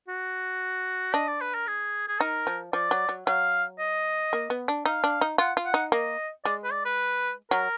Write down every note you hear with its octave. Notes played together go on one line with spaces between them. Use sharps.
F#4
D4 D#5
D5
B4
A#4
G#4
G#4
D#4 A#4
F3
F3 D5
F#3
F#3
F#3 F5
D#5
A#3
B3
D4
D#4 F5
D4
D#4
F4 F#5
F4
F#5
D#4
A#3 D#5
G#3 D5
B4
D5
B4
F#3 A#4